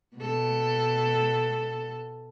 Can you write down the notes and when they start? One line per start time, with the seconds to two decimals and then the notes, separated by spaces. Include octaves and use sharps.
0.17 B2 A4